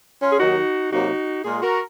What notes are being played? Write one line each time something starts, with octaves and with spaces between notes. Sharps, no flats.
C#4 F4
G#4
D#2 D#3 F#3 D#4 F#4
C3 F#3 A#3 D#4 F#4
A#2 G#3 F4 G#4
F#4 A#4